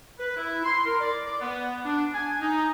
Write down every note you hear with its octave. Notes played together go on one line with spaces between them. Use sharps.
B4
E4
C6
A#4
D5
D5
B3
D4
G#5
D#4